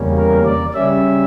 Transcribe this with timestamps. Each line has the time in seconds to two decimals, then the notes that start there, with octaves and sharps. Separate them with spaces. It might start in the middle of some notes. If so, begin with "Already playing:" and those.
Already playing: E2 C#3 G3 A#3 C#4
0.17 A#4
0.46 D5
0.73 C#3 G3 C#4 E5